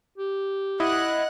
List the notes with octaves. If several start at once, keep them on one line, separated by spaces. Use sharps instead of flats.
G4
E4 D#5 F#5 F#6